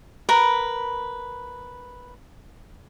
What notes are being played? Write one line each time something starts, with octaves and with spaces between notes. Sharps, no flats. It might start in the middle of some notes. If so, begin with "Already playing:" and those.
A#4 B4 B5